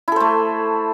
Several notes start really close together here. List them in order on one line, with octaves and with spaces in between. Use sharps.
E4 A4 C5 A3